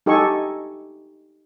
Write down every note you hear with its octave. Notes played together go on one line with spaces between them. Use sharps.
D#4 G4 A4 D#5 G#5 C#6